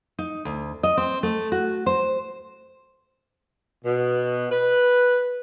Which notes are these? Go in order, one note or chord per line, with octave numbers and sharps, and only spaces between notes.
D#4
D2
D#5
C4
A3
F#4
C5
B2
B4